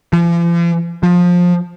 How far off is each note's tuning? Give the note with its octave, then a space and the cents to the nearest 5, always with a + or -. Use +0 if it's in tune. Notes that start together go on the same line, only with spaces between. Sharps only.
F3 -45
F3 +20